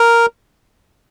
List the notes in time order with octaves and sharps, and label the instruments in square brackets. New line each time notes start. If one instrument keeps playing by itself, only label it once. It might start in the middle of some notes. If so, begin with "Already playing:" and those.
Already playing: [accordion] A#4